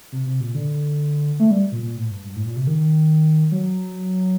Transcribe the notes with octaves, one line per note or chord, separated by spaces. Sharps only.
C3
C3
A#2
D3
A3
G3
A#2
A#2
A2
G2
G2
A2
A#2
C3
D#3
F#3